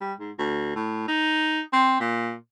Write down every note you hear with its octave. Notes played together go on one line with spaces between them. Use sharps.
G3
G#2
D2
A2
D#4
C4
A#2